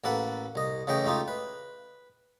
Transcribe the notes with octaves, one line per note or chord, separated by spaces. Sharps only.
A1 A#3 A4 B4 F#5
C2 D#5
C#3 E3 A3 D#5 G5
C#2 A3 D#4 F4 G4
B4